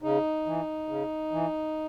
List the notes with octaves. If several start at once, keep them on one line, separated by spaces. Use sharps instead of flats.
C#3 D#4
E3
C#3
E3